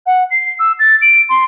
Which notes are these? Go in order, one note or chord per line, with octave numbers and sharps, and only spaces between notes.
F#5
C7
E6
A6
D7
C6